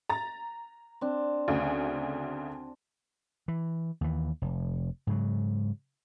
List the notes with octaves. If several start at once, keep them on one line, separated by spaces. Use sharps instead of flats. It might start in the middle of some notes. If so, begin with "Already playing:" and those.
A#5 A6
C4 D4
D2 C#3
E3
D#2 E3
F1
G#2 C#3 F#3